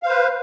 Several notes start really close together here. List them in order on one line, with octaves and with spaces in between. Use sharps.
F5 C5 B4